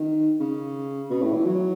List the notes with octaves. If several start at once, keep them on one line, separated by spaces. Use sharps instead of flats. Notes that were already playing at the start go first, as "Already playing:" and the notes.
Already playing: D#3
C#3
B2
A2
E3
F#3